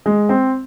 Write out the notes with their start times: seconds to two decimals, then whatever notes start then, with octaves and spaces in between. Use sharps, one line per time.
0.06 G#3
0.29 C4